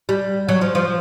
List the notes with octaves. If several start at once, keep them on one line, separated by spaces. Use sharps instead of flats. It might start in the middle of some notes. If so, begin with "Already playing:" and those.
G3
F#3
F3
F3